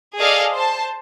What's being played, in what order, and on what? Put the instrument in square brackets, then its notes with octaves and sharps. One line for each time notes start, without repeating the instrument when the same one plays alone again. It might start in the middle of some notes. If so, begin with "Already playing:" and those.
[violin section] G#4 A4 D5 D#5 F5
C5 A5